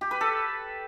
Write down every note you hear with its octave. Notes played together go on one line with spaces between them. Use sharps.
G4
B4
A4